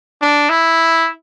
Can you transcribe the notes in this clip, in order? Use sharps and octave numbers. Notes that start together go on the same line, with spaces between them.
D4
E4